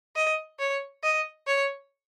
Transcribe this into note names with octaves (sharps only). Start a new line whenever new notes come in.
D#5
C#5
D#5
C#5